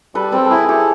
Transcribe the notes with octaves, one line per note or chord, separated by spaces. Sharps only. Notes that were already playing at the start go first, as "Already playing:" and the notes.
G3 A4 B4
C4 A4 B4
A4
E4 G#4 A#4
E4 G4 A4